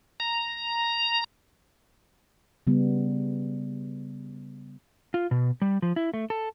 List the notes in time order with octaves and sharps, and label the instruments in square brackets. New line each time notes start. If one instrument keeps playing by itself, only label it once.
[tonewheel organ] A#5
[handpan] C#3 G3 B3
[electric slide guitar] F4
B2
G3
F3
E4
A3
A4